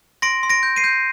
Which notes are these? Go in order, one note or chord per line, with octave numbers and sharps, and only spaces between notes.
C6 A#6 D7
C6
A#6 D7
G6
C7 D#7
G6